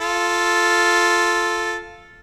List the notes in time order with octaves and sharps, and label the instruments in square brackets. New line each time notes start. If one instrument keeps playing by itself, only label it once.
[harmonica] F4 A4